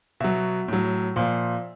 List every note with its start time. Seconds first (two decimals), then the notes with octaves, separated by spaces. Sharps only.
0.20 B2 F#3 E5
0.68 A2 F#3
1.16 A#2 F3